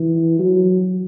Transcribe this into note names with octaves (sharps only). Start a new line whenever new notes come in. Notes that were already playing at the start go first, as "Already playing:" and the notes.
Already playing: E3
F#3